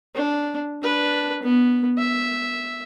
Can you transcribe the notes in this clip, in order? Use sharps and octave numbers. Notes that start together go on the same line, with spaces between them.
D4
D4 B4
B3
E5